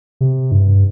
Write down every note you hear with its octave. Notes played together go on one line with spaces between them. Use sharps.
C3
G2